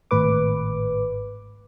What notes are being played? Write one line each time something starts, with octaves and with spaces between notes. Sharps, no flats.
G#1 A2 B4 D6